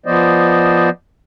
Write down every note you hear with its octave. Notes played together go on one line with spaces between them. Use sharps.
F3 B3 C5 D5 D#5